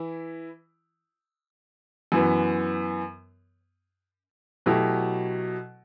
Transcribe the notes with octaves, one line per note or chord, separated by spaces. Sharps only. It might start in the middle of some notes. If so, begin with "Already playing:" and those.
Already playing: E3 E4
F#2 E3 B3
B2 F#3 A3 E4 G4